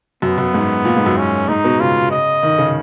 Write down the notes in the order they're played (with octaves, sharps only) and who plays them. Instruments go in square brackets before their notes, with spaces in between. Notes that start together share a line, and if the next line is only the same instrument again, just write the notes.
[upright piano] F#2 [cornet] B3
[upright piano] F#2
G#2
A#2
G#2
F#2
[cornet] C#4
[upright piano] G#2 [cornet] D#4
[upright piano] B2
[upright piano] C#3 [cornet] F4
[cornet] D#5
[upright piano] D#3
C#3